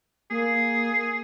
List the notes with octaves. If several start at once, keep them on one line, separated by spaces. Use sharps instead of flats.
A#3 G#4